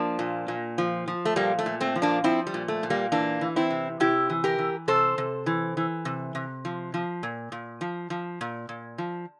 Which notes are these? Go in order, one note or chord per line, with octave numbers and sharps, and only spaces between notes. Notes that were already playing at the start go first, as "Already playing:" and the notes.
Already playing: F3 A#3 D4
A#2
A#2
F3
F3
A3
A#2 G3 A#3
A3
A#2
A3 C4
F3
A#3 D4
F3 C4 E4
G3
A#2
A3
A#2
G3 A#3
E3 A#3 D4
E3
C4 E4
C3
C3 E4 G4
E3
G4 A#4
E3
C3 A4 C5
C3
E3
E3
C3
C3
F3
F3
A#2
A#2
F3
F3
A#2
A#2
F3